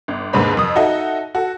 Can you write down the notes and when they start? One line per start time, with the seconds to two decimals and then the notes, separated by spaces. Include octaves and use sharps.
0.08 G1
0.33 D#2 G#2 D3 B4 C5 B5
0.57 F2 D#6
0.76 D#4 F#4 A4 D#5 E5
1.35 F#4 A4